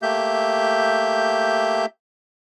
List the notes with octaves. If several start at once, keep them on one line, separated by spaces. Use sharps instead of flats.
A3 A#3 G4 E5 G6